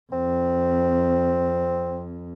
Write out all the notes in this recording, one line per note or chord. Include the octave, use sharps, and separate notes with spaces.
F2 C4